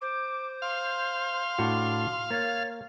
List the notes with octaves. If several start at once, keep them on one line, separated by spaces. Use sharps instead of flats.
C5 D6
F5 C6
A2 D4 F#4
A#3 C#5 A6